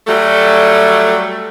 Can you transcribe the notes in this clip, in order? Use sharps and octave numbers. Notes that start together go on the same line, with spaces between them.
F#3 G3 A3